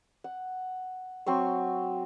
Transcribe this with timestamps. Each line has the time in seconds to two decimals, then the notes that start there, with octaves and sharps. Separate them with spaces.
0.24 F#5
1.26 F#3 C4 C6 C#6